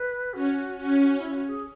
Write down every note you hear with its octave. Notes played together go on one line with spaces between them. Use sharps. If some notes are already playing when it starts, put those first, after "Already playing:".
Already playing: B4
C#4 F#4
C#4
E4
F#4
G#4